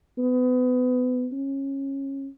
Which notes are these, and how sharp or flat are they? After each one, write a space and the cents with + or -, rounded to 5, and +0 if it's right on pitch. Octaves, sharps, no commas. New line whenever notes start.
B3 +30
C#4 -20